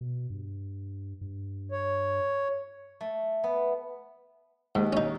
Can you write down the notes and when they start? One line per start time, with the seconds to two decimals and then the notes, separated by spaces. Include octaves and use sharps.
0.01 B2
0.30 G2
1.21 G2
1.71 C#5
3.01 A3
3.44 B3
4.75 D#2 G#2
4.93 C#4 D#4